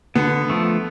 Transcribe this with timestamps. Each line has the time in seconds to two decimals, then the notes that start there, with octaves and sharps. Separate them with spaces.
0.15 D3 B3
0.50 F3 A3